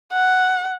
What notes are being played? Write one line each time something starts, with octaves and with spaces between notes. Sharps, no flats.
F#5